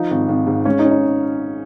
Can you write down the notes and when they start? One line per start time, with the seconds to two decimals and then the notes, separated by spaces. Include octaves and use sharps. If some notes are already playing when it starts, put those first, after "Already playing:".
Already playing: F3 D#4
0.10 G#1
0.29 G#1
0.47 G#2
0.65 G#3 C#4
0.79 D#4
0.85 C#4
0.91 D#4